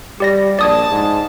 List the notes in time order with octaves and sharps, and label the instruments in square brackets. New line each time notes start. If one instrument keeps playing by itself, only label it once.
[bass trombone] G3 [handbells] G4 D5 A#6
[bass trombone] A#1 [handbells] D5 D#6 G#6 [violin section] A5
[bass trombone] G#2